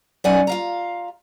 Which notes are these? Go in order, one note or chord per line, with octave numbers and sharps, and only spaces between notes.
F#2 D#4 A4 D5 F#5 G#5
F4 F5 A#5